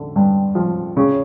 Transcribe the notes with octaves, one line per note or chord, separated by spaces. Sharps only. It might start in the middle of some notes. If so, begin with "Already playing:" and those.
Already playing: D3
G2
F3
C#3